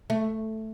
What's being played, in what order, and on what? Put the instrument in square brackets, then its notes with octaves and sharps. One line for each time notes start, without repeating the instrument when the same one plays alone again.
[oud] A3